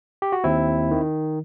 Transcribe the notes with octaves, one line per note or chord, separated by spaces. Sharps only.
G4
F#4
D#2 C4 E4
D#3